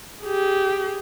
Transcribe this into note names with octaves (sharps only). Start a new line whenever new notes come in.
G4 G#4